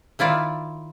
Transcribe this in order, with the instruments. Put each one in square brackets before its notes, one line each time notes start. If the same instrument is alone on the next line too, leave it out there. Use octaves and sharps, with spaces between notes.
[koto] D#3 E4 F4 D5